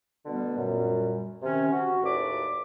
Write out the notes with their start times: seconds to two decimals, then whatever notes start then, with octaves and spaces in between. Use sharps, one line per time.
0.26 B2 D3 G3 A3 B3
0.57 F#2 A#2 G3
1.42 C3 D#3 C#4
1.72 F#4
2.03 D#2 A2 B4 D5 D6